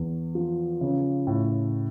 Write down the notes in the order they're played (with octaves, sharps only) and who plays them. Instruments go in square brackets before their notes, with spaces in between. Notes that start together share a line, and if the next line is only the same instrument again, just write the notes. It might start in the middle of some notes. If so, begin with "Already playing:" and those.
Already playing: [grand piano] E2
F3
C#3
A2